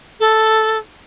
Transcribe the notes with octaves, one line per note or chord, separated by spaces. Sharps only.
A4